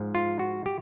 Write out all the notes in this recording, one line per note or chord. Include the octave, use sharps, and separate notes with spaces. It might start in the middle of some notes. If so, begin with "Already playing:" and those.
Already playing: G#2 F3
F4
F#4
G4